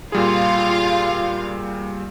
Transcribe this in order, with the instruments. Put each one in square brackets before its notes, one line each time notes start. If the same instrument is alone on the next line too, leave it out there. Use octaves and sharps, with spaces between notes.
[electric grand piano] A#2 G3 G#4 [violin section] F4 F5